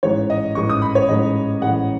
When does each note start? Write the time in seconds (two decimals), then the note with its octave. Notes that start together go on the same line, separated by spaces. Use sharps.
0.03 A1 G#2 E3 C#5
0.30 D#5
0.55 A1 G#2 E3 C#6
0.69 D#6
0.82 B5
0.95 C#5
1.09 A1 G#2 E3 D#5
1.62 A1 G#2 E3 F#5